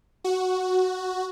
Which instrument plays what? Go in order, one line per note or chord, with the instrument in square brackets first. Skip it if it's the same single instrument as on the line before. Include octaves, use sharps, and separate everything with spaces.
[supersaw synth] F#4